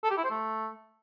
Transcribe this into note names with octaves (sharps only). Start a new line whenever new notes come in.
A4
G4
E4
C5
A3